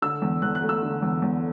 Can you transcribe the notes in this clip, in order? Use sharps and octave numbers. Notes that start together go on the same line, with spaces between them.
D3 E6
E2
E2 F#6
F#6
A3
E6
D3
E2
E2